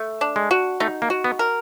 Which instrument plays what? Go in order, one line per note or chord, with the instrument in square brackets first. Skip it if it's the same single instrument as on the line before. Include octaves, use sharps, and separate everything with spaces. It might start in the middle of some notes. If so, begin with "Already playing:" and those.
Already playing: [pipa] A3
D4
[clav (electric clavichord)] G#3
[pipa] F#4
[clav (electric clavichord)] A3 [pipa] D#4
[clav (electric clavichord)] A#3
[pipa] F#4
[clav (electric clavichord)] B3
[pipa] A#4